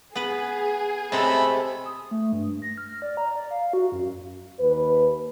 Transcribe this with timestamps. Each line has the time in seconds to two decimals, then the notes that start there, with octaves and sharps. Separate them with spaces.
0.15 B3 G#4 B4
1.12 C3 G#3 A3 A4 B5
1.85 D#6
2.11 A3
2.32 G2
2.62 A#6
2.78 F6
3.02 D5
3.17 A#5
3.35 D5
3.51 F5
3.73 F#4
3.92 F#2
4.60 D#2 B4